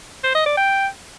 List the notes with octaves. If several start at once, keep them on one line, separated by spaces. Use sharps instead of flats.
C5
D#5
D5
G5